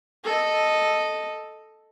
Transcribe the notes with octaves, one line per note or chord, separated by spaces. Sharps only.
A4 D#5